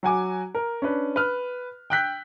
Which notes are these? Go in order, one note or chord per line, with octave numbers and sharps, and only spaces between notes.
F#3 F#4 G#5 D6
A#4
C#4 D4 B4
B4 F6
G5 E6 F#6 G6 B6